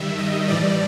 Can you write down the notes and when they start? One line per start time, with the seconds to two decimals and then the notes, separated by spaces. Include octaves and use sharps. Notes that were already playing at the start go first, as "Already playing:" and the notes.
Already playing: G2 D#3 G3 E5
0.18 D#5
0.48 A2 E3 G3 D5